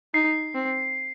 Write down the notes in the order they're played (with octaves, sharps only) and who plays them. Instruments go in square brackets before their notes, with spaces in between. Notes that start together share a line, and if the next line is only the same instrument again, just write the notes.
[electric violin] D#4 [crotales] C7
[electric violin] C4